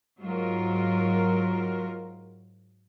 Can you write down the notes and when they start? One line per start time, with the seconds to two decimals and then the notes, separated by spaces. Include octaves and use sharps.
0.20 G#2 F#3 F4 A#4